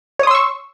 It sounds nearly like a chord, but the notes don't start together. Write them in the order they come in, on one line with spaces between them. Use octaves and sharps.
C#5 D#6 C6 E6 C#6